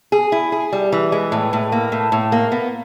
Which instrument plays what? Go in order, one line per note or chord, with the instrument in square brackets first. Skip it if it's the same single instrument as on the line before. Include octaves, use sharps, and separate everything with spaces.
[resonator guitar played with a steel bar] G#4
E4
G#4
G3
E3
G#3
A2
A2
A#3
A2
A2
A#3
B3